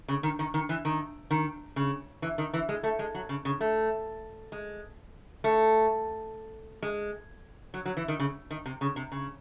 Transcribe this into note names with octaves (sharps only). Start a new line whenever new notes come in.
C#3
D#3
D#3
D#3
E3
D#3
D#3
C#3
E3
D#3
E3
G#3
A3
G#3
F#3
C#3
C#3
A3
G#3
A3
G#3
F#3
F#3
E3
D#3
C#3
D#3
C3
C#3
C3
C#3